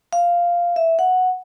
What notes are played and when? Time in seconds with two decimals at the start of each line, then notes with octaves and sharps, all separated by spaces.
0.13 F5
0.76 E5
0.99 F#5